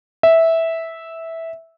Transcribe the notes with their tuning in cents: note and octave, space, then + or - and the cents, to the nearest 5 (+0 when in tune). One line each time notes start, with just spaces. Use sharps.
E5 -10